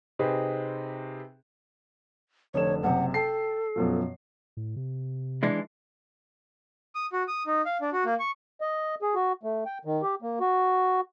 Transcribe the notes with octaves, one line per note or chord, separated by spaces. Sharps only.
C3 C4 D#4 G#4 B4
F1 D3 C#5 E7
F#1 C3 F#5
A4 G5 A5 C7
F#2 B2 F3
A2
C3
E3 G#3 D4
D#6
F#4
D#6
D#4
F5
D4
F#4
A#3
C#6
D#5
G#4
F#4
A3
G5
D#3
G4
A#3
F#4